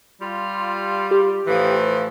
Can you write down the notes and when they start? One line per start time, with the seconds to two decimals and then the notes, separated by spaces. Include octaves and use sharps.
0.21 G3 F4
1.11 G4
1.47 A2 E3 F3